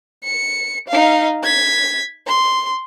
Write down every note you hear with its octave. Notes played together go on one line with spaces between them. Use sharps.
C#7
D#4 F5
G#6 B6
C6